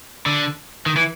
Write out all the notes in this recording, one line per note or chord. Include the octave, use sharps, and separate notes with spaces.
D3
D#3
E3